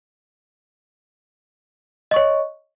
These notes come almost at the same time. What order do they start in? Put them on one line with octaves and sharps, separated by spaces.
D#5 C#6 C#5